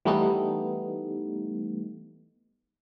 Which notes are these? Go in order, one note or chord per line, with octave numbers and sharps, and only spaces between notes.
E3 G3 A3 B3 D#4